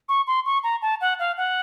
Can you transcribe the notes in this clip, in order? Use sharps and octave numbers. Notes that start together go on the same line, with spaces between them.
C#6
C6
C#6
A#5
A5
F#5
F5
F#5